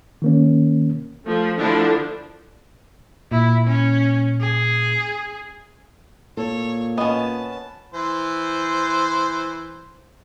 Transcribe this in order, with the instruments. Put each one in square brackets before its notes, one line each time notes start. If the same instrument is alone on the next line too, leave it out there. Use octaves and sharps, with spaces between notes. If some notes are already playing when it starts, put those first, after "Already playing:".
[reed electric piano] D#3 A#3 C#4
[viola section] F3 A3
D3 F3 A3 D4 E4
[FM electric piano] A#2 [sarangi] E4
[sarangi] C#4
G#4
[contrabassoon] A#2 [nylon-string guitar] A4 [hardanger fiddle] C#5
[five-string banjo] B3 C#4 [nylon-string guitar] D#5 [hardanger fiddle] A5
[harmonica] E3 C5